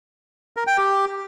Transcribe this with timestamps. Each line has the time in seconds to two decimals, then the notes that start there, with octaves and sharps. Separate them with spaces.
0.57 A#4
0.67 G5
0.78 G4